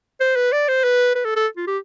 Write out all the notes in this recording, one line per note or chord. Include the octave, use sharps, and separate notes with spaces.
C5
B4
D5
C5
B4
B4
A4
A4
F4
G4